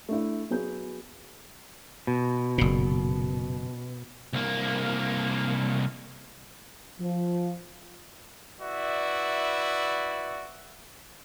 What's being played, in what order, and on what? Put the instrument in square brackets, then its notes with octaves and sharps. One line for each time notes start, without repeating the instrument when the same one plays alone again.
[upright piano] A3 D4 E4
F#3 B3 G#4 G6
[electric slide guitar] B2
[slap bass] F#1 A#2
[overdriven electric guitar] C2 A#3
[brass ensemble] F3
[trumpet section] E4 F#4 B4 D5 E5